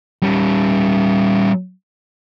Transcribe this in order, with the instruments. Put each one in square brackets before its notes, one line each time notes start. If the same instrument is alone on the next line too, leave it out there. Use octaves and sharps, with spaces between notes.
[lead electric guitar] G3 C#4